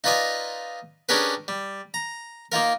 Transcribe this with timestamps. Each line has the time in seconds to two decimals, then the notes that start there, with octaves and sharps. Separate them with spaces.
0.04 D#4 F4 B4 D5 D#5 G#5
1.09 C#4 D4 G4 G#4 A#4 B4
1.48 G3
1.94 A#5
2.52 A#3 D#4 F4 A#4